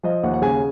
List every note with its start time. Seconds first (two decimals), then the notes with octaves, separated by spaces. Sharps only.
0.03 F3 D#5
0.23 D#2 F#5
0.34 F#5
0.42 C#3 G#5